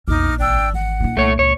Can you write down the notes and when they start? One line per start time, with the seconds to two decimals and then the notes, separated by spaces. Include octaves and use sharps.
0.08 A#1 E2 D#4 D6 F6
0.40 G#1 D4 G5 E6
0.73 E3 F#5
1.00 A#1 E4
1.17 C2 A3 C#5
1.39 C#2 C#5